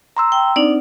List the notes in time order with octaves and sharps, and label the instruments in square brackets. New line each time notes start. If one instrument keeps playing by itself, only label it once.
[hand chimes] A#5 C6 E6
[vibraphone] G5
[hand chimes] C4 [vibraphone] D4 D#4 D5